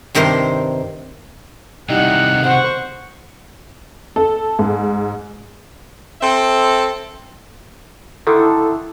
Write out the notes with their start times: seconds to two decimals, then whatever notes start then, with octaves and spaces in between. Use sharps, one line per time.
0.15 G2 C3 D#3 A#4 C5
1.89 C3 D#3 G3 D#4 E4 F#4 F#5
2.44 C5 F#5 C#6
4.16 A4
4.59 G#2
6.21 C4 A4 E5
8.27 D3 D#3 E4 A4